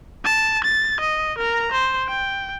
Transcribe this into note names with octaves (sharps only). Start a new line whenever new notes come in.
A5
A6
D#5
A#4 A#5
C5
G5